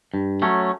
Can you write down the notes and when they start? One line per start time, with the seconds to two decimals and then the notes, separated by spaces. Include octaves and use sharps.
0.14 G2
0.42 F#3 A3 C#4